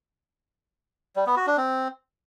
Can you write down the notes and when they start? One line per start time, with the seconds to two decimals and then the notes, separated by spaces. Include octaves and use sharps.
1.16 G3
1.26 B3
1.37 F#4
1.47 D4
1.57 C4